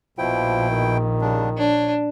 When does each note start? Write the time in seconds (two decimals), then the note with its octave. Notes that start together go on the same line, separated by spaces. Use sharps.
0.18 A#1 B2 F3 E4 G5
0.70 D#3
1.21 C#3 G3 D4
1.58 D4 C#5